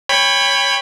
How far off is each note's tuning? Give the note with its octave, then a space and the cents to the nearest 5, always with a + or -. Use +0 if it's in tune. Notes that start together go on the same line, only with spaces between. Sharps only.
C#5 +0 G5 +30 B5 +5